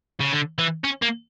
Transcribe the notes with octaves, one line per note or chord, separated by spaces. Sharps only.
C#3
D3
E3
C#4
A#3